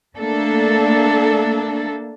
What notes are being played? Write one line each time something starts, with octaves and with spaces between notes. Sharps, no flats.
A3 A#3 D4 A4